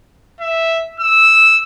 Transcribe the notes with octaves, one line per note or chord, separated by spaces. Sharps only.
E5
E6